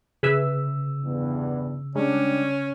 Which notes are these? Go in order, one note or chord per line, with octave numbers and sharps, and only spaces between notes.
C#3 G#4 B4 E5 E6
E2 G2
G3 G#3 C#4 D4